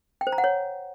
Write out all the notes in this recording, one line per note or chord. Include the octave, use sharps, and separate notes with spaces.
G5
C5
A#5
F#5
C#5